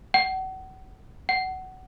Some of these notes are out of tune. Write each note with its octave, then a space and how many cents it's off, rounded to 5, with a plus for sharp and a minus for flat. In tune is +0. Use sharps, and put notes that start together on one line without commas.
F#5 +35
F#5 +20